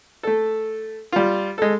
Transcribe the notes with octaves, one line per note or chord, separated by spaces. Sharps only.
A3 A4
G3 F4
G#3 A4